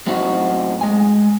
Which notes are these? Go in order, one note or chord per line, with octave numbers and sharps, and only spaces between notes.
F#2 A2 C4 D#4 F4 F#4
G#3 G#5